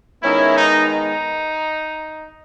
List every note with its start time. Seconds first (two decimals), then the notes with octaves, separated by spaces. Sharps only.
0.23 D#3 G#3 B3 C#4 E4
0.56 D#4
0.88 D#4